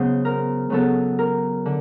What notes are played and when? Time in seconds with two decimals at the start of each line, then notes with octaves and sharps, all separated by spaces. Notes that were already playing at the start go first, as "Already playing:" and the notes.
Already playing: C#3 F#3 B3 C5
0.25 A#4
0.70 C#3 F#3 B3 A4
1.19 A#4
1.66 D3